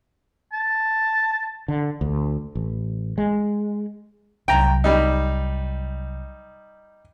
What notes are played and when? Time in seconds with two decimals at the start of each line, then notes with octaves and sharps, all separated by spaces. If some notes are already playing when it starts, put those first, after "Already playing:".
0.53 A5
1.68 D3
2.01 D2
2.55 A1
3.18 G#3
4.48 C2 F#3 G5 A#5
4.84 G3 D#4